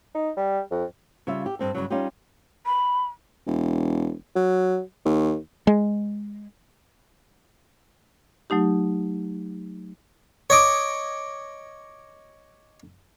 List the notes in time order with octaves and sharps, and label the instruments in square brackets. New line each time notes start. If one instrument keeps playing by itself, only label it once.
[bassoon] D#4
G3
F2
[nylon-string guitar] C#3 G3 F4 E5
G4
G2 C4 A4
G2 C#3 F#3
G3 C#4 D#4 F4 G4
[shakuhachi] B5
[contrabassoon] E1
F#3
D#2
[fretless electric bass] G#3
[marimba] F#3 A3 D#4 G4
[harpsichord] C#5 D#5 D6